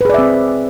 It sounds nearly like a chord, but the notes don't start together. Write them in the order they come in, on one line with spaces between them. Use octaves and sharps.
B4 G#4 D5 E5 C4